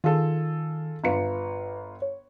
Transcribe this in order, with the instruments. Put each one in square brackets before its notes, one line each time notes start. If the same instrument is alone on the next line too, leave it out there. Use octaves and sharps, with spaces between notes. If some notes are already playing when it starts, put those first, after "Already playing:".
[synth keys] D#3 [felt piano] F4 G#4 A4
[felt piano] G1 F4 C#7 [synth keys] B4 A#5
[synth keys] C#5